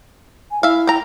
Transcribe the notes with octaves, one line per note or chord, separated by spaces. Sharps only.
G#5
E4 E5 F5
G5 A#5